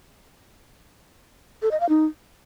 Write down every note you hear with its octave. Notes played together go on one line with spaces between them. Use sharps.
A4
D#5
F5
D#4